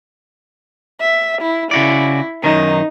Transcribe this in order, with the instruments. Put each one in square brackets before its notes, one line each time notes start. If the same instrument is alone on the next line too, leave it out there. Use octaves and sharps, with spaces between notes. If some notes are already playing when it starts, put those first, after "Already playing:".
[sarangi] E5
E4
[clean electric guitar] C#3 F#4 D5 [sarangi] E4
[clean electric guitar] F#2 D#3 [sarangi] D#4